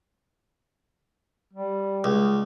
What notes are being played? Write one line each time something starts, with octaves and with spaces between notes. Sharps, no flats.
G3
C#2